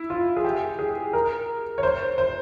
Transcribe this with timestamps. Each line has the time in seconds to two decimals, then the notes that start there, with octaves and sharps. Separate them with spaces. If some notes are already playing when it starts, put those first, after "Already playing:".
Already playing: E4
0.10 F4
0.37 G#4
0.44 G4
0.79 G#4
1.13 A#4
1.78 C#5
1.83 C5
2.18 C5